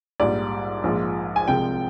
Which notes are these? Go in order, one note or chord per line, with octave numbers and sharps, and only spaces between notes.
A#1 G#2 G3 D5
A#1 G#2 F3 G#3
G#5
C2 C3 F3 G#3 G5